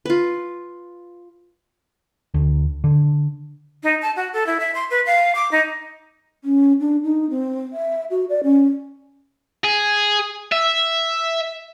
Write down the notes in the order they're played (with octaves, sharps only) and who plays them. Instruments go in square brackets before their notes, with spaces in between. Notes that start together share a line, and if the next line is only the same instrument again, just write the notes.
[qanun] F4 B4
[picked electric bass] D2
D3
[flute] D#4
A5
F#4
A4
E4
E5
C6
B4
F5
D6
D#4
[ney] C#4
D4
D#4
C4
E5
F#4
D5
C#4
[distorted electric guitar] G#4
E5